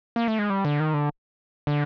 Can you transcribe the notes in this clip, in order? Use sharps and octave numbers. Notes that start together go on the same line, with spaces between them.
A#3
A3
G#3
G3
D3
D#3
D3
D3